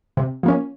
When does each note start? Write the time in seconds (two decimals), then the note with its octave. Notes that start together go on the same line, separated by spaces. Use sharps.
0.17 C3
0.43 F3 A#3 C#4